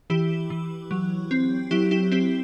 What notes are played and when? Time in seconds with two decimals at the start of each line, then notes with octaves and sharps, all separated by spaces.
0.10 E3 E4 G4
0.50 E3
0.91 F#3
1.31 C4
1.71 F#3 E4 G4
1.91 E4 G4
2.12 C4 E4 G4